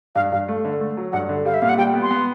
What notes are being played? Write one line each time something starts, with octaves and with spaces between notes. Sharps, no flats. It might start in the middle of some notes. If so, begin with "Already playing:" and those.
G2 F5
G2 F5
A3
D3
A3
F#3
G2 F#5
D3
G3 F5
E5
A#2 F5
F#5
G3 G5
B3
C6
B3